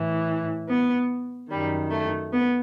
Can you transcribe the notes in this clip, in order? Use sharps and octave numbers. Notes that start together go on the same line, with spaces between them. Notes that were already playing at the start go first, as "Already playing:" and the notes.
Already playing: A2 E3
B3
F#2 D#3 G3
A3
B3